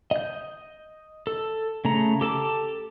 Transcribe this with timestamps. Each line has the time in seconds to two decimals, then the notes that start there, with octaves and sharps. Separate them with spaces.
0.11 D#5 G6
1.27 A4
1.85 C#3 A3 A#5
2.21 G4 A4 A5 D6